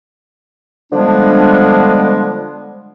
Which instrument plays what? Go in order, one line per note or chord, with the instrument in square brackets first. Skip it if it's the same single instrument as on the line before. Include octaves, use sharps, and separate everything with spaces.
[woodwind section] D3 F3 G3 G#3 B3 D4